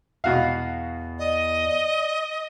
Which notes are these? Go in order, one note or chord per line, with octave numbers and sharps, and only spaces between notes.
E2 B2 F#4 F5
D5 D#5